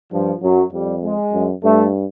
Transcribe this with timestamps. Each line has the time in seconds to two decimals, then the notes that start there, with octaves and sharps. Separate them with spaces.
0.12 G2 F3
0.42 F#2 F#3
0.73 F2 G3
1.03 G#3
1.33 F#2
1.63 G2 A3